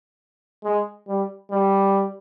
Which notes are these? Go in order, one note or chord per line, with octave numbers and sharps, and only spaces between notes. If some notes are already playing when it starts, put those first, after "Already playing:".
G#3
G3
G3